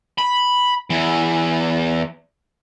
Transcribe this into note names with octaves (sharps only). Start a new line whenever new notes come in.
B5
E2 E3